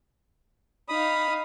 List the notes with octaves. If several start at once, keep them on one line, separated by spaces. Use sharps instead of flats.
D#4 F5 B5 D#6